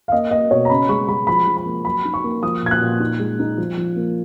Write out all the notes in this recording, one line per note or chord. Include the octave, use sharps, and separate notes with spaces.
F5
A#3 D#5
A#3 D#5
B2 C#5
A#5
C#3 B5
G#3 C#6
G#3 B5
F3 B5
F3
B5
A#3
F#3 B5
D#4
C#6
A#3
F3 D#6
A#2 G#6
F#6
A#2
D#4
G#3
D#4
F3
F3
A#3